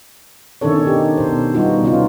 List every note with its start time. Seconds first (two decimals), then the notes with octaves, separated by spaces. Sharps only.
0.61 B2 D#3 C#4 D4 A4 C#5
0.87 D#4 G4
1.18 B2 C5
1.54 G3 B3 D#4 F4 F#4
1.83 C3 C#4 D#4 F4